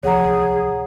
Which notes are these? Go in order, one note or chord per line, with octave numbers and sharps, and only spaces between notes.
D1 C2 F3 G#4 C#5 F#5 A#5